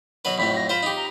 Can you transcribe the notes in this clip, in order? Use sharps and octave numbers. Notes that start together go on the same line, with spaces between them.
B2 F#3 B4 F#7
F2 A2 F#3 B5
A#6
F4 C5 B5
D#4 G4
A#5